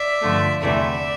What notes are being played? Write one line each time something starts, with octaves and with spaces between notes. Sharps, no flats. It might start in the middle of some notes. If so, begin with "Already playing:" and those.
Already playing: D5 E5
G2 D3 F3 A3
E2 C3 E3 A3 D5 E5